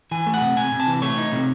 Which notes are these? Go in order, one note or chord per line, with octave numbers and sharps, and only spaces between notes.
E3 G#5
A3
F#5
C3
C3 G#5
C3
A5
E3
A3 C#5
D#4
C3